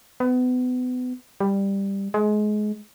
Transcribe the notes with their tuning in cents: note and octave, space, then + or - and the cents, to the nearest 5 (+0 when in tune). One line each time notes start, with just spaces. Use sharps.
B3 +30
G3 +10
G#3 +25